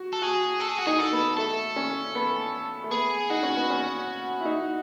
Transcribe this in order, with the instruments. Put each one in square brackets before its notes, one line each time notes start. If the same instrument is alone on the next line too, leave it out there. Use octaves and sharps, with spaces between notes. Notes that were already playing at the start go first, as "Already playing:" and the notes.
Already playing: [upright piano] F#4
[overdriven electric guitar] A4
[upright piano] F#4 [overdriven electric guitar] G#4
[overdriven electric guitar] A4
G#4
F#4
[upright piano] D#4 [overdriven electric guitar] G#4
[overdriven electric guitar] A4
[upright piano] B3
[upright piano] A3 [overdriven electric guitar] A4
[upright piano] C#4
B3
A3
[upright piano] B3 [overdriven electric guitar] G#4
[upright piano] D#4 [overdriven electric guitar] F#4
[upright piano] C#4
B3
C#4
E4
D#4